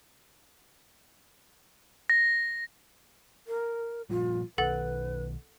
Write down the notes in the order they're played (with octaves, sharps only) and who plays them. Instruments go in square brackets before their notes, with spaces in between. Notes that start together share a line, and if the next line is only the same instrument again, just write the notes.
[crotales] A#6
[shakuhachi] A#4
[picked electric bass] A#2 F3 G3 [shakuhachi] F4
[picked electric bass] B1 D#3 [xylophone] A4 F#5 A6 [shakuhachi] B4